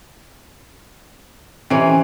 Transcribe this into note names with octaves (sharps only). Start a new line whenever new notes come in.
C3 E3 C#4